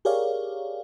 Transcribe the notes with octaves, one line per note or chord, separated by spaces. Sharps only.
G4 G#4 A#4 C#5 D5 F5